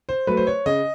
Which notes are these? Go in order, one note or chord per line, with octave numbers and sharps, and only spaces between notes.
C5
F#3 A3 B4
C5
C#5
C#3 D#5